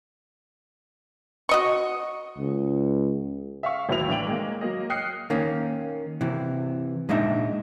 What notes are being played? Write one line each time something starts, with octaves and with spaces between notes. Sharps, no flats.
F#4 D#5 C#6
C#2
E5 F5 C#6
A1 D#2 F#3 E4 B4 F7
A2 E3 D4 G5 D7 F#7
G#3 A#3
F#3 A#3 D#5
G5 D#6 F6 F#6 C7 C#7
D#3 A#3 C#4
C3 E3
A#2 G#3 D4 D#4 E5